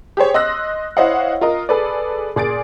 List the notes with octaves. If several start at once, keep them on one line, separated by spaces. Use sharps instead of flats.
G4 G#4 C5 C#5
D#5 C6 E6 F#6 A#6
E4 C5 C#5 D#5 F5 F#5
F4 A#4 D#5
G#4 A4 B4 D5
A#2 G#4 A6 D7